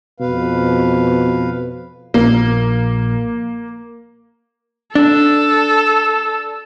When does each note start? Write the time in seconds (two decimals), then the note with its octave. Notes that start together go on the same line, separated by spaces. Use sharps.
0.20 F2 B2 B4 F5
2.14 A#1 A#3
4.95 D4 A4